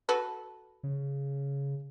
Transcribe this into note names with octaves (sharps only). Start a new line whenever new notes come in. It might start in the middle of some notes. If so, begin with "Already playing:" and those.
F#4 A4 B4
C#3